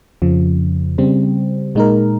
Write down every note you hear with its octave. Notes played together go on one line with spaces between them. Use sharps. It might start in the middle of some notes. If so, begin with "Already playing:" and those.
F2 C#3 F3
C#3 G3 C4
A#2 G#3 D#4 A#4